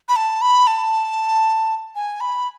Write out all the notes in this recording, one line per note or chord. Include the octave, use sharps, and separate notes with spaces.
B5
A5
B5
A5
G#5
B5